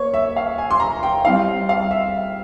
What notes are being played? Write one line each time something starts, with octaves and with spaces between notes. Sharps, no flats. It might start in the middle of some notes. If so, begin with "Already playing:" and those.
Already playing: A#3 C#5
E5
F5
G#5
C6
A#5
G5
G3 C4 E4 F5
F5
E5